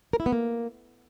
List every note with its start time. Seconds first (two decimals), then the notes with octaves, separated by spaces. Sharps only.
0.13 A#4
0.20 E4
0.26 B3
0.32 A#3